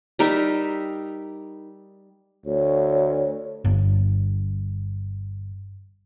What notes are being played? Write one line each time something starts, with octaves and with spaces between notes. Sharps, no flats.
G3 D#4 A#4 E5
D2 C#5
G1 G2